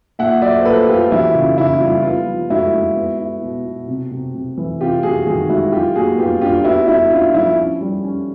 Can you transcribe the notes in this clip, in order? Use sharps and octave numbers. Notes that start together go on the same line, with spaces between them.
A#2 E5 F#5
F#3 D5 E5
C5
A#2 A4 B4
A#3 F4 G4
E3 E4 F#4
C#3 F4
C#3 E4
G3 F4
B3 F4
F3
G#3 E4 F#4
G#3
B3
E4
B2
B2
C3
C3
C3
E3
C3 F4 G4
C3 F#4 G#4
D#3 F#4 G#4
G#3 E4 F#4
F#3 F4 G4
A#2 F#4 G#4
B3 F4 G4
D4 F4 G4
B3 E4 F#4
B3 E4 F#4
D4 F4
F3 E4
C#4
G3
C#4